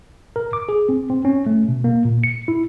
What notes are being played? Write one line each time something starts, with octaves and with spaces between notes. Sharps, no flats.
A#4
D6
G#4
C4
C4
C#4
A3
B2
A#3
A#2
C#7
E4